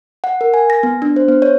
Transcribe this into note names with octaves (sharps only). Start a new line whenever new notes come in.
F#5
A#4
G#5
A#6
B3
D4
C5
B3
C#5